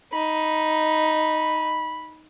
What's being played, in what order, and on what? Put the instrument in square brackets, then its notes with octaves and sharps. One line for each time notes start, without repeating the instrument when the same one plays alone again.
[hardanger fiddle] D#4 [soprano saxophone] B5